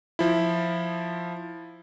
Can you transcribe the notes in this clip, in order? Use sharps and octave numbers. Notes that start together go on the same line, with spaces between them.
F3 E4